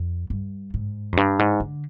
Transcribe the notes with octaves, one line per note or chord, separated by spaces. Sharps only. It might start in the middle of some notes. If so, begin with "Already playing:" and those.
Already playing: F2
G2
G#2
F2
G2
G#2
D3